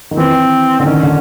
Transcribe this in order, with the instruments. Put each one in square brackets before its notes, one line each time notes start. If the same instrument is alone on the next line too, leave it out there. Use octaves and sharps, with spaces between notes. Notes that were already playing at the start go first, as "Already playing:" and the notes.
[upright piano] D#3
[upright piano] E3 [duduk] C4
[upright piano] D3 [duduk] C4
[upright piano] D#3 [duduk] C#4
[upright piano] D3